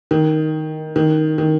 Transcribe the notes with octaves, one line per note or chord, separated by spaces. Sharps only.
D#3
D#3
D#3